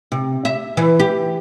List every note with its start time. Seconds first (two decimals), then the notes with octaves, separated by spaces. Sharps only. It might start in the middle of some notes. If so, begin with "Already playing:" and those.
0.12 C3
0.45 E5
0.77 E3
0.99 G4